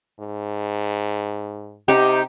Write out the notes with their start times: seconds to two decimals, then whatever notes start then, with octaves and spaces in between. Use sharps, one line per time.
0.20 G#2
1.88 C3 D#4 G4